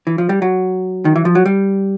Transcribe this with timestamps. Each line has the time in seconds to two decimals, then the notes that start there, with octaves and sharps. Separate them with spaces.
0.07 E3
0.18 F3
0.29 G3
0.42 F#3
1.05 D#3
1.16 E3
1.25 F3
1.35 F#3
1.46 G3